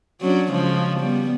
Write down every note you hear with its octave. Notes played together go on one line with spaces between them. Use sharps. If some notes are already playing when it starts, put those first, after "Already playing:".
F#3 C#4 D4
C#3 F3 G#3
G3 B3